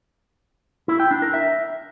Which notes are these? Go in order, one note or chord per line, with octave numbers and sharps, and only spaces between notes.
E4
G5
D4
A#4
E5